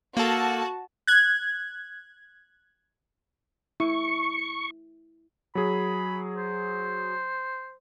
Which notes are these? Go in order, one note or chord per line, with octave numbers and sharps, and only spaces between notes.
A#3 F#4 A4 A5
F#6 G#6
E4 C#6
F#3 G#4 B5
C5